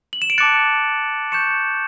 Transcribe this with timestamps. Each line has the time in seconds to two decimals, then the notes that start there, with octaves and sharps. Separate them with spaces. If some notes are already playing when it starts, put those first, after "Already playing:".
0.13 F#7
0.22 E7
0.30 D7
0.38 A5 D6 F#6 A6 C#7
1.32 C#6 G6 C#7 E7